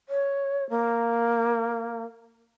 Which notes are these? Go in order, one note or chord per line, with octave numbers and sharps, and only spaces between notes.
C#5
A#3